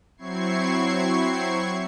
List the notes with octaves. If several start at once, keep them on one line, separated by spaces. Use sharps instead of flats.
F#3 C4 E4 C#6 G#6 C7